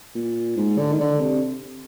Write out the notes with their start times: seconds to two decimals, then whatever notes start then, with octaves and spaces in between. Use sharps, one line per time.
0.15 A#2
0.57 G#2
0.78 D3
0.93 D#3
1.00 D3
1.21 C3